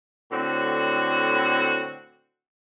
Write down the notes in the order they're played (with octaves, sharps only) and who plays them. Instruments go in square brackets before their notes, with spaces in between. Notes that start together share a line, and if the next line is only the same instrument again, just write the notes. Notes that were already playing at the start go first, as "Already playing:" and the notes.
[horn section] A2 D3 C4 F#4